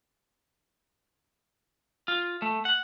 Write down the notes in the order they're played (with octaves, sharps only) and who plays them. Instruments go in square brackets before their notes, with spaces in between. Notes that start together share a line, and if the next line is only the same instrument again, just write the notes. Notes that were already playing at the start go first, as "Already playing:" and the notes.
[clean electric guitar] F4
A3
F#5